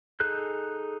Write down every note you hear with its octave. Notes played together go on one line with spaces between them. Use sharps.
D#4 G#4 A4 F#6 G6